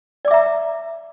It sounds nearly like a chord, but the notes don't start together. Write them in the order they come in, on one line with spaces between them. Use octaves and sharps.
D5 D6 E5 A#5